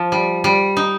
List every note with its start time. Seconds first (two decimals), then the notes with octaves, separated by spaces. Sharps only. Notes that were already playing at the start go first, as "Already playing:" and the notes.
Already playing: F3
0.12 G3
0.44 G3
0.77 D#4